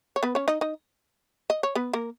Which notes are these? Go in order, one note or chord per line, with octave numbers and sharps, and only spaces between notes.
C#5
B3 B4
C#4 C#5
D#4 D#5
D#4 D#5
D#5
C#5
B3 B4
A#3 A#4